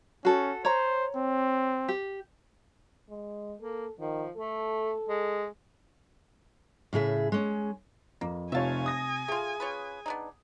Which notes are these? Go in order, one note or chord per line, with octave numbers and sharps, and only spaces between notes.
C#4 F#4 A4
C5 C#5 A#5
C4
G4
G#3
A#3 A4
D#3 F3
A3 A4
G#3
A2 C#3 G#4 E5
G#3 C#4
F2 A#3
F1 C3 F4 C#5 E5 G#5 A5
D#6 A#6
A3 F4 G#4
C#4 F4 B4
B3 D4 D#4